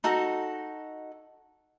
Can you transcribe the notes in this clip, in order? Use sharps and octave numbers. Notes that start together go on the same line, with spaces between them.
D#4 F#4 A4